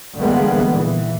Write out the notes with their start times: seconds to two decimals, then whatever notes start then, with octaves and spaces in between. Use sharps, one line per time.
0.19 D3 E3 G3 G#3 A#3 B3
0.73 A#2 E3